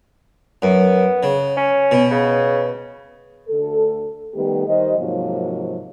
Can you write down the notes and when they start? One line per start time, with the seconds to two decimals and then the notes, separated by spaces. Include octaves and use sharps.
0.62 F#2 B3
1.23 C#3
1.57 C#4
1.91 B2
2.11 C#3
3.48 D2 A4
4.34 D#3 G3 A3 B3 G4
4.67 D#3 G3 C5 D#5
4.98 G#2 C3 F3 F#3 A#3